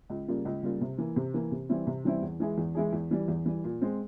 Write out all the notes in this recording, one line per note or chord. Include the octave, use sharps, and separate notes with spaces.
C#2
C#3 G3 A#3 F4
C#2
C#3 G3 A#3 F4
C3
E3 A#3
C3
E3 A#3
C3
E3 G3 C4 E4
C3
E3 G3 C4 E4
E2
E3 G#3 E4 G#4
E2
E3 G#3 E4 G#4
E2
E3 G3
E2
E3 G3
A#2
G#3 C4